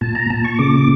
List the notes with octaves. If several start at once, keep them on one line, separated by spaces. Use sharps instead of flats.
A#2 A5
A#5
A#2 A5
C#6
C#3 D6